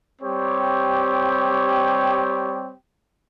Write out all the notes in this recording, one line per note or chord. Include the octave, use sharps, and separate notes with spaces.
G3 C4 G4 C#5 G5